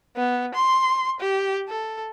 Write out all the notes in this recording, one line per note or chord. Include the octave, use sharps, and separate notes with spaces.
B3
C6
G4
A4